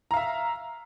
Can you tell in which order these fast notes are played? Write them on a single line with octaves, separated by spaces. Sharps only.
A#5 F5 E5